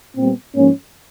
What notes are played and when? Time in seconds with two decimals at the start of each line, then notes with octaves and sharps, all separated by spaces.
0.17 A#2 G3 B3 C4
0.55 G#2 F3 A#3 C#4